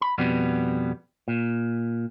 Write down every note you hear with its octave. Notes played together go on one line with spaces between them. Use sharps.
B5
F2 B2 G3 B3
A#2